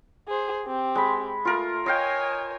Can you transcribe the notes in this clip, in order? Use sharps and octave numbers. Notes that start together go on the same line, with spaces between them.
G#4 C5
C4 G4
G#3 B5
A3 F4 A#4
C#5 D#5 F5 G5 G#5